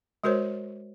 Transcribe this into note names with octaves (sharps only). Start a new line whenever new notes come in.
G#3 F#4 A#4 C5 C#5